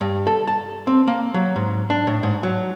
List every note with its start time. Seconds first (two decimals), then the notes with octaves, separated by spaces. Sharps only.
0.01 G2
0.27 A4
0.47 A5
0.87 C4
1.07 A#3
1.34 F#3
1.56 G#2
1.90 D4
2.07 A2
2.23 G#2
2.43 F#3